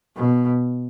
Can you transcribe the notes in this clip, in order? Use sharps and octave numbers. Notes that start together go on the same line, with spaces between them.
B2